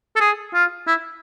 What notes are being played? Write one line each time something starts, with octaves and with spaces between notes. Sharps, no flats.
A4
G#4
F4
E4